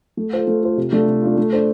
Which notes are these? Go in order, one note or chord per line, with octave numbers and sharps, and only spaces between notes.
A3
F4 A4 C5
A3
F4 A4 C5
C3
A3 D4 F4
C3
A3 D4 F4
A3
D4 A4 C5